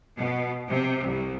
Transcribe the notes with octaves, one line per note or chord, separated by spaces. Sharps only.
B2
C3
C2